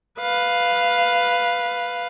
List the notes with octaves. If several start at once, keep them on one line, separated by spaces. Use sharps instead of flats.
B4 F5